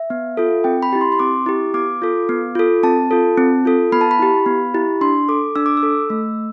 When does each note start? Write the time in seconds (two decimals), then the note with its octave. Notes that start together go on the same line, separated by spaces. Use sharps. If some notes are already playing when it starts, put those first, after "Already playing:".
Already playing: E5
0.10 B3
0.37 F4 A4
0.64 C4 G5
0.83 B5
0.93 E4 G4
1.01 C6
1.12 C6
1.19 C4 D6
1.46 E4 G4
1.74 B3 D6
2.02 F4 A4
2.29 B3
2.55 F4 A4
2.83 C4 A5
3.11 F4 A4
3.38 C4
3.65 F4 A4
3.92 B3 B5
4.01 A5
4.11 B5
4.19 E4 G4
4.46 B3
4.74 E4 G4
5.01 D4 C6
5.29 A4 D6
5.56 D4 E6
5.66 D6
5.77 E6
5.83 A4
6.10 A3